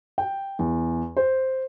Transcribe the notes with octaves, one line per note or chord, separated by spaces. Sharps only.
G5
E2
C5